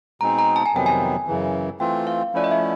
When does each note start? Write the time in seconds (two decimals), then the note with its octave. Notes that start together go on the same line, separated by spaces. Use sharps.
0.21 B2 G#3 C4 D#4 G#4 A#5
0.39 A#5
0.56 A5
0.66 G#5
0.74 F2 C3 D#3 F#3 B3 G5
0.86 G#5
1.27 F#2 C#3 E3
1.80 E3 A3 C4 F4 G5
2.07 F5
2.34 F3 A3 C#4 E4 D5
2.44 D#5
2.51 E5